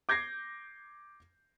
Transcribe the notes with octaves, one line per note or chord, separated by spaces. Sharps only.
D6 G6 G#6 A#6 C7